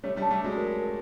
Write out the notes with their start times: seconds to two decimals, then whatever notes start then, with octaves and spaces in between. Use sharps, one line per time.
0.03 G3 A3 C#5
0.16 G3 A3
0.22 A5
0.31 G3 A3
0.40 F#3 G#3 A5
0.57 A#4
0.76 A#4